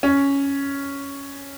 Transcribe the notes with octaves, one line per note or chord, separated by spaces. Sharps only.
C#4